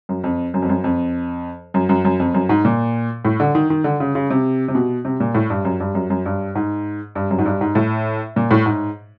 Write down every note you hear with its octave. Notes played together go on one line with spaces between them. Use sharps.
F#2
F2
F#2
F2
F#2
F2
F#2
F#2
F#2
F2
F#2
G#2
A#2
A2
D3
D#3
D#3
D3
C#3
C#3
C3
C3
B2
C3
A#2
A2
G2
F#2
G2
F#2
F#2
G2
G#2
G2
F#2
G#2
G2
G#2
A2
A#2
A2
G#2